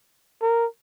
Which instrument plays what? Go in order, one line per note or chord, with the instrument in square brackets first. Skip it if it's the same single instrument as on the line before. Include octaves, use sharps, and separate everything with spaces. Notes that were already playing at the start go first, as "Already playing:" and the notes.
[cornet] A#4